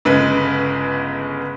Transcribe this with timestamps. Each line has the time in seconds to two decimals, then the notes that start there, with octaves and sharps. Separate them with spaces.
0.05 G1 C#3 G#3 B4